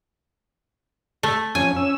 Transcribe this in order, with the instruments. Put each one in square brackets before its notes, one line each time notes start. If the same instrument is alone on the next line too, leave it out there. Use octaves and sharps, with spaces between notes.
[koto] A3
[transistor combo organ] F2 C#4 [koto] G#5
[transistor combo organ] C#4 E6